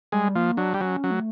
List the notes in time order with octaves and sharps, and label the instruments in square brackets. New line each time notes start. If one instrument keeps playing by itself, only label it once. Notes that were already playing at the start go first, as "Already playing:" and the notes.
[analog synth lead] G3 [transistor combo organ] G#3
[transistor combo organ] F3 [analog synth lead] A#3
[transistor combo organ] F#3 [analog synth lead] D4
[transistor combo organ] G3
[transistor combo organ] F#3 [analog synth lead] C#4
[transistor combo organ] F#3
[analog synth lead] A3